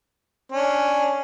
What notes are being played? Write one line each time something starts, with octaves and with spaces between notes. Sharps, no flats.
C#4 D4